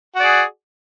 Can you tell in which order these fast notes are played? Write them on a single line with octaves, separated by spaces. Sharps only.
F#4 D5 G#4